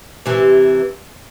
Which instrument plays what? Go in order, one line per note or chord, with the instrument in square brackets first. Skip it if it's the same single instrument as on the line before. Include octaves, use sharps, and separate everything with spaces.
[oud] C3 E3